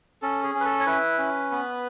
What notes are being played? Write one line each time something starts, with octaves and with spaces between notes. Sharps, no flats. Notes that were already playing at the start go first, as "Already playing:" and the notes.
C#4 A4
G#4
C#4
B4
A4
C#5
E4 B4
C#4
B3